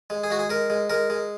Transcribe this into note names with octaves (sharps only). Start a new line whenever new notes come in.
G#3
G#4
G#3 F#4
G#4
G#3 A#4
G#3
G#3 A#4
G#3